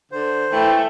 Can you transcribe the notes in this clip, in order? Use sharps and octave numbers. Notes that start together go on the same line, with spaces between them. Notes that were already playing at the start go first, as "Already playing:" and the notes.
D3 C5
E3 A3 G5